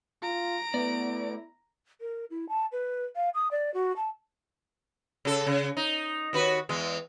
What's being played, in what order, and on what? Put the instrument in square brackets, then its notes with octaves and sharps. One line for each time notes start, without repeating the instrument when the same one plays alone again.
[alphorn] F4 [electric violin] A#5 D7
[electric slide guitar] A3 D5 [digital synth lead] B3 [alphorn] E4
[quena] A#4
E4
A5
B4
F5
D#6
D5
F#4
A5
[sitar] C#3 A4
C#3
D#4
D#2 F#4 B4
E2 G#3